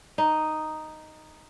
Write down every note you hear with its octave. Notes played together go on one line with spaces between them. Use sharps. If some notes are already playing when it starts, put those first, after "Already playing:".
D#4